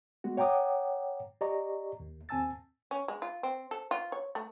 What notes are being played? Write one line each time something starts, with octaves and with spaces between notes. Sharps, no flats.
G#3 B3 F#4
C#5 F#5 G5 A#5 D6 D#6
G4 D5 D#5 A#5 C#6
D#2
D#2 C4 G#5 A5 E6 A6
C#4
G#3
F4
C4
A4
F4
C#5
A3